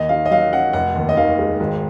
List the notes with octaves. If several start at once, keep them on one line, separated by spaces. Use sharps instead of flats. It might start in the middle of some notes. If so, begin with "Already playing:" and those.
Already playing: D#2 D#5
D#3 F5
D#5
F#3 F5
C#4 F#5
F1 F#5
D#2
D#5
D#3 F5
G#3
G#1